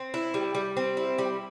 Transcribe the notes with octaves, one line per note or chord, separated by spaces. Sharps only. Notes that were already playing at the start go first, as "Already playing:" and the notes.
Already playing: C4
E4
G3
G3
C4
E4
G3